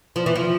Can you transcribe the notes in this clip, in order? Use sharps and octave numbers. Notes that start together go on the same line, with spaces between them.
F3
E3
F3